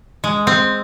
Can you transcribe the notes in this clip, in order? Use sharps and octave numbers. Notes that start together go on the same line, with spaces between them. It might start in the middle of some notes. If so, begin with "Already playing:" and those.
G#3
C4